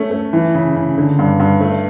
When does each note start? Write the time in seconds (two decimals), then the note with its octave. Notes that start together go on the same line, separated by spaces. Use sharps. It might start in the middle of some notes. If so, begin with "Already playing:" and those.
Already playing: A3 C#4
0.11 A3
0.33 E3
0.55 C#3
0.76 C#3
0.97 D3
1.19 G2
1.40 G2
1.61 A3